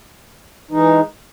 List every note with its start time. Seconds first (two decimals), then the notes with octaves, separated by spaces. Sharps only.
0.71 E3 G#3 D#4